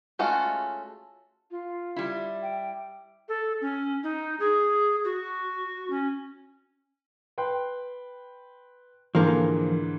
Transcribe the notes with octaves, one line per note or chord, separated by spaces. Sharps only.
G#3 A3 C#4 F4 F#4
F4
G3 E4
G5
A4
C#4
D#4
G#4
F#4
C#4
B4 G5 C6
G#2 D3 E3 F3 A#3